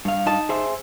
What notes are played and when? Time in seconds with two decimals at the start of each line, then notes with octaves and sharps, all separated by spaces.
0.05 G2 F5
0.26 D#4 A5
0.49 G#4 C5 E5